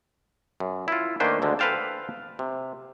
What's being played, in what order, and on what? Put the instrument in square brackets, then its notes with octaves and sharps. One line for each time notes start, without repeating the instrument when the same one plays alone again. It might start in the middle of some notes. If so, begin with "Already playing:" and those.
[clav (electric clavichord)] F#2
E4 F4
D#3 A3 A#3 D4 B4 C5
D2 D3 G#3
A4 B4 C5 F5 G5 A5
C3